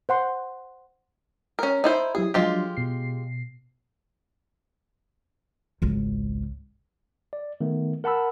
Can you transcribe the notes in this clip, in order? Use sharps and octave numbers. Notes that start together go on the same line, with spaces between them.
C5 F#5 C6
C#4 A#4
D#4 E4 C5
F#3 E4 G4 G#4
F3 F#3 G#3 D4 F4 G4
B2 C7
G#1 C#2
D5
D#3 A3 B3
A#4 F#5 A5 B5 E6